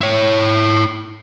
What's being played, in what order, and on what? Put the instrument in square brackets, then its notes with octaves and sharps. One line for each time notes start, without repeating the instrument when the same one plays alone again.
[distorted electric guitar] E4 C#5